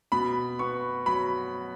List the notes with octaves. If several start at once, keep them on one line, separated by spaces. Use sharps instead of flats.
B2 B5
B3 C#6
F#3 B5